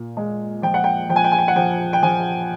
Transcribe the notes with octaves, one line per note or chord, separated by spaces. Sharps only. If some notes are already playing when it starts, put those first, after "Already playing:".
Already playing: A#2
G#3
F3 G5
F#5
G5
F3 G5
G#5
G5
G#5
G5
F#5
F3 G5
G5
F3 G#5